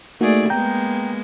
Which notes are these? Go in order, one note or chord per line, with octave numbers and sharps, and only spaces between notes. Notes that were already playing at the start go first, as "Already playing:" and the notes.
A3 A#3 D#4 F#4 G#4 D5
G#3 A#3 B3 G5 A#5 G6